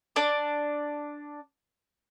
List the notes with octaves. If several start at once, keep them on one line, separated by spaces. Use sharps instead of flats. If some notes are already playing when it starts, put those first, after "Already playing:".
D4 D5 D6